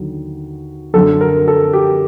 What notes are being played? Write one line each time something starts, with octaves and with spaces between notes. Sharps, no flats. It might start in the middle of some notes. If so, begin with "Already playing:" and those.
Already playing: D#2 D3 F#3
F#2 D3 F#3 A4
A#4
A4
G4